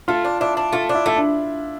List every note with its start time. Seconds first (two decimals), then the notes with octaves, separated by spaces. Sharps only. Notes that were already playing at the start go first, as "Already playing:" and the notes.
0.08 A3 F4
0.24 D4
0.41 D4 E4
0.57 D4
0.73 A3 F4
0.89 D4
0.95 E4
1.06 A3 E4
1.16 D4